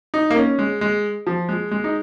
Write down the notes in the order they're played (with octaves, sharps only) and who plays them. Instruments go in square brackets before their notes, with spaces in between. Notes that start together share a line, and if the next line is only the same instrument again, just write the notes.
[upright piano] D#4
A#3
C#4
G#3
G#3
F3
G#3
G#3
D#4